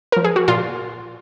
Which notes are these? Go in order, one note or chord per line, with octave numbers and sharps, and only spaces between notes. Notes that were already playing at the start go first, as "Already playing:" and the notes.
F3 A#4
G#4
F#4
A#2 F4